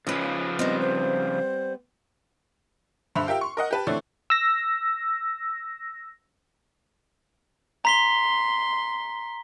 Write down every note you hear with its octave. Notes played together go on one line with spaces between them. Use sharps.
C#3 F3 C#4 B4 D#5
G3 B3 C4 D#5
C5
G2 D3 C5 E5 B5 F7
F4 G4 A#4 E5 G5
C6 C#6
A#4 D#5 F#5
G4 B4 A5
D3 E3 A3 C4 C#5 D5
E6 A#6
A#5 C6 B6 G7